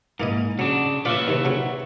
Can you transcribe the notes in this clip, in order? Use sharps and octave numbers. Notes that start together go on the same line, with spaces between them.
G#2 A#3 E4 D#5
C#3 F#3 D4
F4 B4 C#5 D5 E5
D#2 C3
C#3 F#3